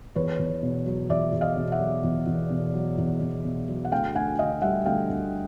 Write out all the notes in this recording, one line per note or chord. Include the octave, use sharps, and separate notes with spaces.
E2 B4 C#5
E2
B2
F#3
E2 D5 E5
E2
D#5 F5
B2
E5 F#5
F#3
E2
E2
B2
F#3
E2
E2
B2
F#3
F#5
D2 F5 G5
D2 F#5 G#5
D3 D#5 F5
G3 E5 F#5
D2 F5 G5
D2